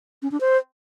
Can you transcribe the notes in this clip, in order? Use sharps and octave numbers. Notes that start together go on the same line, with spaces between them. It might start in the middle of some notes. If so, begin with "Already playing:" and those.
C#4
D4
C5